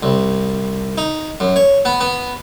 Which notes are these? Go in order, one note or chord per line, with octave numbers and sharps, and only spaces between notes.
C2
D#4
F#2
C#5
B3
B3